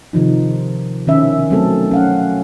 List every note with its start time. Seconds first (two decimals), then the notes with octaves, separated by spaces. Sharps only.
0.13 C3 D#3 F3 D#4
1.07 B2 D#3 C#4 E5
1.50 F#3 A3 C4 A4
1.91 C#4 F5 F#5